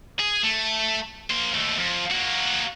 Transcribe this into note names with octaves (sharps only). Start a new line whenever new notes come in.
G#4
A3
A#3 C5
D#2 A3
F2
A#3 F#4